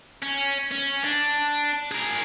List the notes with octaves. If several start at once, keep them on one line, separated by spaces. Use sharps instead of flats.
C#4
C#4
D4
G#4 A#4